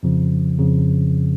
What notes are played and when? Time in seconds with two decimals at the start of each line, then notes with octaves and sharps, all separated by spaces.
0.03 F2 C#3 F3
0.58 F2 C#3 F3